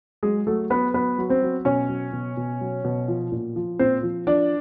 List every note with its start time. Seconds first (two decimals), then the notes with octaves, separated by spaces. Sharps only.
0.23 F#3 G#3 G#4
0.47 F#3 A3 A4
0.70 F#3 B3 B4
0.94 F#3 B3 B4
1.18 F#3
1.30 C4 C5
1.42 F#3
1.65 B2 C#4 C#5
1.89 F#3
2.13 B2
2.37 B2
2.61 F#3
2.84 B2
3.08 F3
3.32 A#2
3.56 F3
3.79 A#2 C4 C5
4.03 F3
4.27 F3 D4 D5